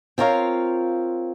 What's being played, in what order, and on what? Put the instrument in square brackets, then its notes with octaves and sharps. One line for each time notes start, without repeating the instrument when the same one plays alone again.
[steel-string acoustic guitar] C4 F4 A#4 C#5 F5